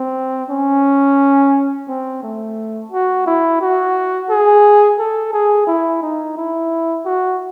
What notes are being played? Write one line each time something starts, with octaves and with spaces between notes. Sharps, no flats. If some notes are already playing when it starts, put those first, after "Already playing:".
Already playing: C4
C#4
C4
A3
F#4
E4
F#4
G#4
A4
G#4
E4
D#4
E4
F#4